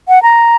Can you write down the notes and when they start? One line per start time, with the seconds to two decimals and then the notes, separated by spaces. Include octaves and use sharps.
0.08 F#5
0.23 A#5